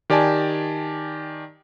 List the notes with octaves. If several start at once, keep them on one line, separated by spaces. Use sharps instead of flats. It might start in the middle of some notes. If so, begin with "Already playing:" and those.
D#3 G4 D5 G#5 A5